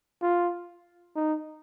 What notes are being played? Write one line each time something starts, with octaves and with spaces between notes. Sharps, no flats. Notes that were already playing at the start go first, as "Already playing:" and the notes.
F4
D#4